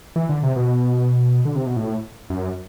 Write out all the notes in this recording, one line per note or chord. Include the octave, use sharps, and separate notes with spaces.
E3
D3
C3
B2
D3
C3
B2
A2
F#2